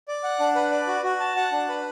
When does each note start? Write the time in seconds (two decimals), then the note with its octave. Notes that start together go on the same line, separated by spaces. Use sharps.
0.08 D5
0.23 F#5
0.40 D4
0.55 B4
0.71 D5
0.87 F#4
1.03 F#4
1.20 A5
1.36 F#5
1.52 D4
1.69 B4